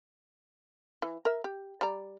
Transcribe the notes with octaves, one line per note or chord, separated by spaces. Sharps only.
E3
A#4 E5
G4
G3 D5 A#5